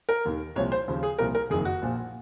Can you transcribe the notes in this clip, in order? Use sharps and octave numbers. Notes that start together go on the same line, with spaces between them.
A#4
D#2 D#3
C2 A#2 F3 C#5
C5
D#2 C#3 F3
G#4
C2 A#2 F3 A#4
A#4
F#1 F2 D#3 G#4
F#4
A#1 A#2 F3